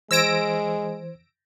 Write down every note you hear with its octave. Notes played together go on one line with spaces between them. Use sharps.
E3 G#3 C5 E6 G#6 A#6 D7